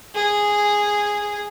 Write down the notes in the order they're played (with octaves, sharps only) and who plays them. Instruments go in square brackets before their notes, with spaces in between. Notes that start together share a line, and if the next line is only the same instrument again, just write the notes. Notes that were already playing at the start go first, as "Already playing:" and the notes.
[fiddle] G#4